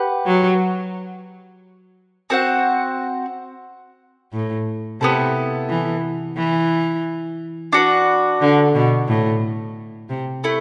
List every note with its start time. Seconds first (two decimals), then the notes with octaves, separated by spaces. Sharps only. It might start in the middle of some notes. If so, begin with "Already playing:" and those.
Already playing: G4 B4 F#5
0.26 F#3
2.30 C4 F#4 C5 F#5
4.33 A2
5.01 C3 B3 E4 A4
5.69 E3
6.37 E3
7.73 D4 F#4 B4
8.41 D3
8.74 B2
9.08 A2
10.09 C3
10.44 A3 E4